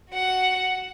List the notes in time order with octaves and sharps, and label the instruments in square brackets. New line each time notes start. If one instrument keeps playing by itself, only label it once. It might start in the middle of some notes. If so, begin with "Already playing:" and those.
[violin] F#4 F#5